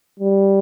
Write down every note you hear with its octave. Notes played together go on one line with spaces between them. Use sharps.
G3